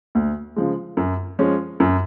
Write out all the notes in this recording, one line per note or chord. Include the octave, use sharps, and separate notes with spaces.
D2
C#3 F3 G#3
F#2
F3 G#3 C#4
F#2